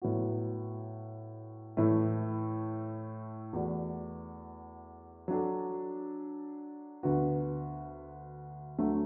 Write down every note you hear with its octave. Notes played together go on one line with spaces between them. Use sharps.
A2 F#3 B3 F#4
A2 E3 A3 E4
E2 E3 A3 F#4 D5
F#3 D4 A4
D2 D3 B3 F#4 B4
D2 D3 F#3 A3